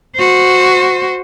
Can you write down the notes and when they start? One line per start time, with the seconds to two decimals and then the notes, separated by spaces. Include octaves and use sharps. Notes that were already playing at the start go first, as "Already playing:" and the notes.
0.16 F#4 C5